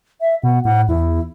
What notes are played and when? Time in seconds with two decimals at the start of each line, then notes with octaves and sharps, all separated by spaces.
0.21 E5
0.43 B2 F#5
0.65 A2 F#5
0.88 E2 E4